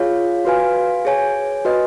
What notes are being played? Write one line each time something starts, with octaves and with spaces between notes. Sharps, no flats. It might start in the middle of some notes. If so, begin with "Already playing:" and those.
Already playing: F4 G#4 C#5 F5
F#4 B4 F5 G#5
G#4 C#5 G#5
F#4 B4 D#5